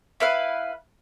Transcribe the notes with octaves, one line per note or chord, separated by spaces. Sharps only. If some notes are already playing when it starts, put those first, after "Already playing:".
E4 B4 F5